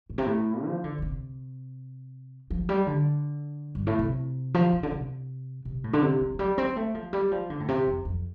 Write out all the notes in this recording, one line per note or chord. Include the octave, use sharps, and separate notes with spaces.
A2
C3
A2
F3
D3
D3
C3
F3
G3
D3
G2
A2
C3
F3
C3
D3
C3
C3
A2
D3
C3
F3
F3
G3
C4
A3
F3
G3
F3
D3
A2
C3
F2
F2